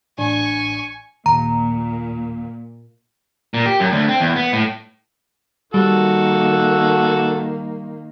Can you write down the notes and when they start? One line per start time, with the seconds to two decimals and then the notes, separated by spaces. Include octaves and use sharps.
0.18 A1 D4 G#5 C#6
1.26 D#2 A#2 A#5
3.54 A#2
3.66 G4
3.80 F#2
3.92 D2
4.08 C4
4.20 E2
4.36 B3
4.53 A2
5.74 D#3 G3 A#3 F#4 A4